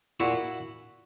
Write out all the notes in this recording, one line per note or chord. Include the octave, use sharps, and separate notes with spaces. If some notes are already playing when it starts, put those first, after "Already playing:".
A#2 E4 F#4